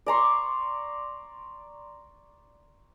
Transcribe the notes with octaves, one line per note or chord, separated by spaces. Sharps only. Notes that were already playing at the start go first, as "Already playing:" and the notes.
D5 A#5 C6 C#6